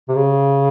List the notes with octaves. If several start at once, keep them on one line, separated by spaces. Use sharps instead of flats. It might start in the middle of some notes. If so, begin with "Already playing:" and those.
C3
C#3